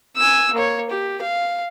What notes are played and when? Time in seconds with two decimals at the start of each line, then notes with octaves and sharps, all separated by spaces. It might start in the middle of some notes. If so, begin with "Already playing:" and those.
0.17 G#5 E6
0.53 A#3 C#5
0.90 G4
1.21 F5